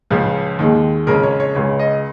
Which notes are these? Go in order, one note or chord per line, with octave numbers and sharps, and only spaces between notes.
C#2 C#3 F3 C#4
D#2 D#3 G#3
F2 C#3 G#3 C#4 A#4
C#5
C#5
C#2 C#3 G#3 C#5
D#5